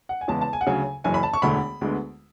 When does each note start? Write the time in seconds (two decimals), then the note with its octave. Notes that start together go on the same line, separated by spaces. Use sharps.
0.09 F#5
0.21 G#5
0.28 E2 C#3 G#3 B3 A5
0.41 A5
0.53 G#5
0.61 F#5
0.67 D2 C#3 F#3 G#5
1.04 F#1 F#2 E3 G#5
1.14 B5
1.23 A5
1.33 C#6
1.42 E1 D2 D3 A3 B5
1.81 D2 D3 G#3 B3